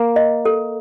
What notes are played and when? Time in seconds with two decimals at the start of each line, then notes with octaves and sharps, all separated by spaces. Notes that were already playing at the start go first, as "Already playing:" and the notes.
Already playing: A#3
0.16 D#5
0.45 A4